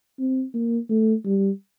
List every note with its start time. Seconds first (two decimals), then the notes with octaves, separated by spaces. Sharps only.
0.19 C4
0.54 A#3
0.89 A3
1.25 G3